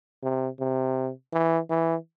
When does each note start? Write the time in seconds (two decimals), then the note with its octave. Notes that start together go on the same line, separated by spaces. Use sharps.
0.23 C3
0.60 C3
1.33 E3
1.70 E3